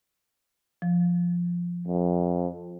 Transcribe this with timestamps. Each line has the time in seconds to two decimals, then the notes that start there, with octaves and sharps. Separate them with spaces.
0.82 F3
1.88 F2